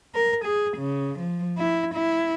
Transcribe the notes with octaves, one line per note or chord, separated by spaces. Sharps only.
A#4
G#4
C#3
F3
E4
E4